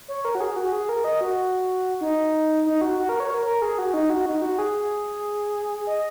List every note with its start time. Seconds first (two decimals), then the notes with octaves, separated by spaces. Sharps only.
0.08 C#5
0.25 A#4
0.35 F#4
0.40 G#4
0.57 F#4
0.72 G#4
0.89 A#4
1.04 D#5
1.21 F#4
2.01 D#4
2.66 D#4
2.81 F#4
2.98 F#4
3.09 A#4
3.20 C#5
3.30 A#4
3.46 A#4
3.62 G#4
3.78 F#4
3.94 D#4
4.10 F#4
4.26 D#4
4.42 F#4
4.58 G#4
5.87 D#5